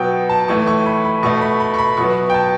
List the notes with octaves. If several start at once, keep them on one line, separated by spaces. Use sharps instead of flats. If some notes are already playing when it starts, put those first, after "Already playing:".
Already playing: B2 F#3 B3 G5
A5
A2 E3 A3 C#6
C#6
B5
B5
B2 A3 C#6
B5
B5
C#6
B5
B2 F#3 B3 C#6
G5
A5